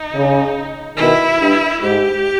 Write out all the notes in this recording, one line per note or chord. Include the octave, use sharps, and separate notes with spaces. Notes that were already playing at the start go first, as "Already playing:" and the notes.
Already playing: D#4
C#3
B2 D#3 E4
G2
G#2 G4